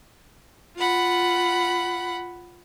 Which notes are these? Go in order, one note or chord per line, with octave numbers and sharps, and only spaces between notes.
F4 F#5 B5